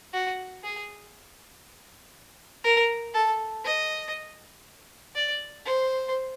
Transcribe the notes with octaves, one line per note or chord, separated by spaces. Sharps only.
F#4
G#4
A#4
A4
D#5
D5
C5